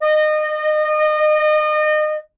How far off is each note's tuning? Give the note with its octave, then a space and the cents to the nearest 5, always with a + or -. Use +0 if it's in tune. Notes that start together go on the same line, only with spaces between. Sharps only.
D#5 -30